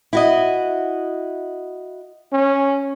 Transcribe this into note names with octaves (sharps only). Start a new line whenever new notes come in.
E4 F#4 D#5
C#4